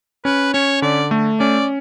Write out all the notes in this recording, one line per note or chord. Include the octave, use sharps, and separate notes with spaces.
C#4 B4
C#4 C#5
D3 D5
A3
C#4 D5